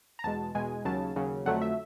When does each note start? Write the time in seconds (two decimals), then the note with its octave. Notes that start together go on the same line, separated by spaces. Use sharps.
0.19 A#5
0.24 E2 B2 G#3 A5
0.54 E2 B2 G#3 G#5
0.85 D#2 C#3 F#3 A5
1.16 D#2 C#3 F#3
1.45 F2 D3 F#3 A3 F#5
1.62 E5